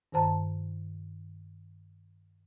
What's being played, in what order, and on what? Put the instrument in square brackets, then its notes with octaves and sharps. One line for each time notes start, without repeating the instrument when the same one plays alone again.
[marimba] G2 D#3 C5 A5 A#5